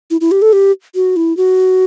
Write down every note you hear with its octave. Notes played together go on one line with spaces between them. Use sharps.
E4
E4
G4
A4
G4
F#4
E4
F#4